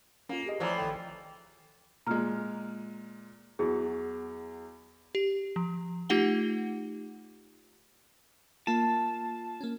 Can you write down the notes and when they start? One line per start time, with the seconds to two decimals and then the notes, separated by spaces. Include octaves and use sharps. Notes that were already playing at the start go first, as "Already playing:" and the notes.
0.29 A#3 C#4 F4
0.46 G4 G#4 D#5
0.60 A2 E3 F3 D5 A#5
0.78 A#1 D#3 G5
2.07 A#2 G#3 A#5 F6
3.59 E2 F#3 G#4
5.15 G4
5.56 F3
6.09 A3 D#4 F4 G4 F#5 G7
8.67 A#3 F4 A5
9.61 A#3 C#4